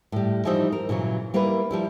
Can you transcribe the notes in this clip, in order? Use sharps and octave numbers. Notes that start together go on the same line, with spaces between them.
A2 G3
E3 F3 G3 D#4 C5 E5
A#4
A#2 C#3 E3 F#3
G3 A#3 E4 A#4 B4
F3 G3 E4